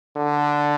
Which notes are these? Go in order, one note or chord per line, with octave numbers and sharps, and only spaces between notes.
D3